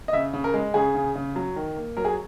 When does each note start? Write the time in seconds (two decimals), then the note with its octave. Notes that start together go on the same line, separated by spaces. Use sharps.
0.08 D#5
0.13 C#3 E5
0.33 C#3
0.44 A#4
0.54 G#3
0.74 C#3 G#4
0.95 C#3
1.16 C#3
1.36 F#3
1.56 D#3
1.76 A#3
1.97 F#3 A#4
2.05 G#4